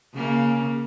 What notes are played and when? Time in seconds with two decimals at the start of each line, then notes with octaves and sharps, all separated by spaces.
0.15 C#3 A#3